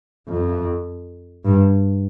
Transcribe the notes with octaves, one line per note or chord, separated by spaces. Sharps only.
F2
G2